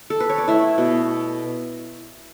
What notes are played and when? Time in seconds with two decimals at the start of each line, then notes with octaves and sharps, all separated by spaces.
0.10 A4
0.20 B4
0.29 C#5
0.38 D5
0.48 A3 E4 E5
0.78 B2